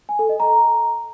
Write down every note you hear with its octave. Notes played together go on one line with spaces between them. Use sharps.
G#5
A4
D#5
A#5